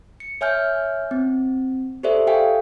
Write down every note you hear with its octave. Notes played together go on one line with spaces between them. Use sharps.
C#7
C#5 E5 G#5 F6 G6
C4
G4 A4 C5 D5 E5
G4 A4 F5 G5 G#5